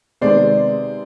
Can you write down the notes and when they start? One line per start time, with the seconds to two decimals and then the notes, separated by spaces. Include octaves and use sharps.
0.21 C3 D#3 G#3 B3 C5 D5